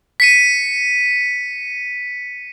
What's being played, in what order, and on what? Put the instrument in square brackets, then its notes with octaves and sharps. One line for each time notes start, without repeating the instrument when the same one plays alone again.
[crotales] B6 C#7 D#7